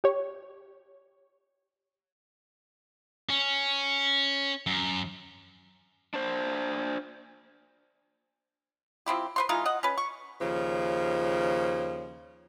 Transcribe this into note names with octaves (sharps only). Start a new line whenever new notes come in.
G4 C#5
C#4
F#2
D4 C5
F3 C4 E4 G4
B4 C5 C6
E3 G#3 D#4 F4
D#5 F#5
C#4 B4
C#6
D#2 C#3 F3